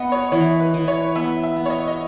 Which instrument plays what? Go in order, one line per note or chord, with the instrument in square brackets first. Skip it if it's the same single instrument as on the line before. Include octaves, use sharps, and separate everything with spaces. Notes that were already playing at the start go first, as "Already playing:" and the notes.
Already playing: [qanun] B3 [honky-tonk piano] D#5 F#5
[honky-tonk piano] C#5
[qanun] E3 [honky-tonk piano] C#5
[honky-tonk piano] B4
[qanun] E3
[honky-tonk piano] C#5
[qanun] B3 [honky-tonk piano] E5
[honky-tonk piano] E5
[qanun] B3
[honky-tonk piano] C#5
D#5
D#5